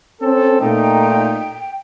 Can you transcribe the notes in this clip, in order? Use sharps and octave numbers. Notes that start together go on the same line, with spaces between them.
C4 C#4 A4
A#2 A3 D#4 G5